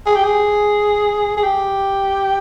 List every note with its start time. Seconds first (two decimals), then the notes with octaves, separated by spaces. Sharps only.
0.06 G#4
0.16 G4
0.24 G#4
1.37 G#4
1.44 G4